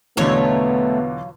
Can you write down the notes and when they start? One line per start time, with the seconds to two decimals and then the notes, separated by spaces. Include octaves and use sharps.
0.17 E2 B2 D3 F#3 A3 B3 F4 C#5